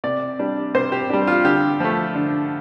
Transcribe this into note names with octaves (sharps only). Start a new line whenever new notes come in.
C3 D5
G3 D4
C3 C5
G4
G3 D4 G4
F4
D3 G4
F3 A3
D3